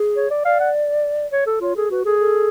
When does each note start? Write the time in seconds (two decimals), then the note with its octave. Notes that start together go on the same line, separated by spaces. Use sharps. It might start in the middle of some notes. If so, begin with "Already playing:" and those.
Already playing: G#4
0.17 C#5
0.31 D5
0.45 D5 F5
0.60 F#5
1.33 C#5
1.47 A4
1.61 F4 C#5
1.76 G#4 A4
1.90 F#4 B4
2.05 G#4 A4
2.20 A4